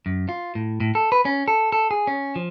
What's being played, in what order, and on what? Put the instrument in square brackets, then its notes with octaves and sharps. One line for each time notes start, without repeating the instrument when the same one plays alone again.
[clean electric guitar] F#2
F4
A2
A2
A4
B4
C#4
A4
A4
G#4
C#4
F3